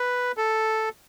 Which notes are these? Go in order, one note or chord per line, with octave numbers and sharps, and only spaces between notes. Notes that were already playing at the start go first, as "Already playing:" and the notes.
Already playing: B4
A4